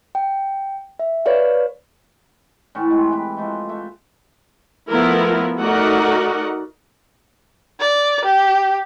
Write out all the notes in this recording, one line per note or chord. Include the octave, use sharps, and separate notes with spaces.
G5
E5
B4 C#5 D5 F5
A2 E3 F#5 C#6
G#3 C4 G4
B4 E5
F3 G#3 A3
A3 E5
F3 A3 B3 E4 A#4
A3 D#4 F#4 A#4 D5 F#5
D5
G4